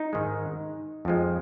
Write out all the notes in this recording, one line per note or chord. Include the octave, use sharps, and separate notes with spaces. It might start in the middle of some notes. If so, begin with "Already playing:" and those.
Already playing: D#4
G#2 D#3 G#3
F2 F3 G#3